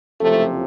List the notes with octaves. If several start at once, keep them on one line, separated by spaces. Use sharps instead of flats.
F#1 F2 C3 F3 A3